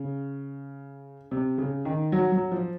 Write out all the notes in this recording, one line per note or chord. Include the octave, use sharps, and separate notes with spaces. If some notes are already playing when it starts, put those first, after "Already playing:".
Already playing: C#3
C3
C#3
D#3
F#3
F#3
F3